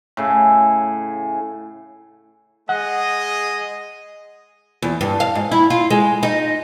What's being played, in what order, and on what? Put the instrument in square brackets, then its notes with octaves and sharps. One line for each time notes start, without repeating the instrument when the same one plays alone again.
[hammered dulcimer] A2 C#3
[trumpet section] G#3 G#4 D#5 [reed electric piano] F#5
[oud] E2
G2
F5
G#2
E4
F4
G#3
D#4